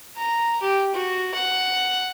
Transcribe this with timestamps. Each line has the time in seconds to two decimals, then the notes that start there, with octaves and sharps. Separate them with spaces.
0.17 A#5
0.62 G4
0.94 F#4
1.34 F#5